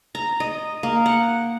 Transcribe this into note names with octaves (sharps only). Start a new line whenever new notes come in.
A#5
D#5
A#3
F#5